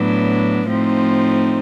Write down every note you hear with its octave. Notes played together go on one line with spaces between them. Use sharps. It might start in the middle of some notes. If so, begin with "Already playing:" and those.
Already playing: A2 F#3 B3 D4
A2 F3 A3 C4 D#4